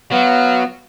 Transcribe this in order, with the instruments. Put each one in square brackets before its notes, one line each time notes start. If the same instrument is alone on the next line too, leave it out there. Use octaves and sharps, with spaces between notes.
[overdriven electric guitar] F#3 [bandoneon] B3 [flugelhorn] F5